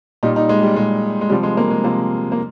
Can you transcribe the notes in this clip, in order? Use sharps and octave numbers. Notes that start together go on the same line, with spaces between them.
A#2 G3 D#4
D#4
G#3
G3
A#2 G3 G#3
G#3
C3 F3 G3
G#3
A#3
G#3
C3 F3 A#3
A#3